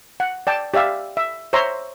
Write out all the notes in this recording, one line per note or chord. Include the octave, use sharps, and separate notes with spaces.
F#5
D5 G5 A5
G4 D5 E5 F5
E5
C5 C#5 E5 A#5 C6